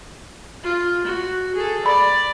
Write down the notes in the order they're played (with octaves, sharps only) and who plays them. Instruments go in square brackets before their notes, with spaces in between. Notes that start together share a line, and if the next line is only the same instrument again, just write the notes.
[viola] F4
F#4
G#4 A4
[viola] D5 [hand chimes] B5